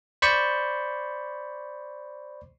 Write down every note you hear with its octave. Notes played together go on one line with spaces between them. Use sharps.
C5 D5 B5 C#6